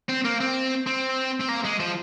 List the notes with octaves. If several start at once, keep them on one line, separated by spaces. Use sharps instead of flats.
C4
A#3
C4
C4
C4
A#3
G#3
F3